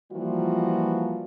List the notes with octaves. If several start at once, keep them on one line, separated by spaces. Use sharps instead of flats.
E3 F3 G3 A#3 F4 F#4